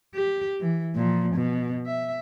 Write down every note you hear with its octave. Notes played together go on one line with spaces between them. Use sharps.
G4
E3
A#2 F3
B2
E5